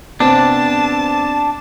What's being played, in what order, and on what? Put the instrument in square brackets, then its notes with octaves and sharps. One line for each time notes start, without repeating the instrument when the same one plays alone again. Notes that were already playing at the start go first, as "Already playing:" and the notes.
[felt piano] C3 B3 C4 [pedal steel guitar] D4 [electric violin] A5